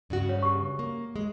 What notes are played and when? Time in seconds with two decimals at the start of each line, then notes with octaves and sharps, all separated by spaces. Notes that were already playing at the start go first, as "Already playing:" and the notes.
0.10 G2 C#3 F#4
0.29 C#5
0.43 G4 C#6
0.79 A#3
1.16 G#3